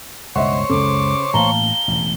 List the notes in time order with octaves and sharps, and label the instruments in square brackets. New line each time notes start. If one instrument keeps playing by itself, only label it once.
[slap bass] C#2 G2 B2 [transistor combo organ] C5 C#5 [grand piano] D#5 E5 F#5
[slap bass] C#2 F#2 [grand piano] C#3 A4 [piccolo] D6
[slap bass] A2 E3 A#3 [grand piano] F5 A5 A#5 [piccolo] G7
[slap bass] E1 A1